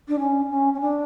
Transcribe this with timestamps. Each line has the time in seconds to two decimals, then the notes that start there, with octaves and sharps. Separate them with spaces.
0.08 D4
0.19 C#4
0.50 C#4
0.74 C#4
0.81 D4